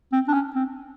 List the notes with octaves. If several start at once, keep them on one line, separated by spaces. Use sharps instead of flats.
C4
D4
C#4
C4